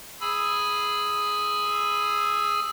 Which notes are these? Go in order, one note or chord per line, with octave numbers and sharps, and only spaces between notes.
G#4 G#5 B5 E6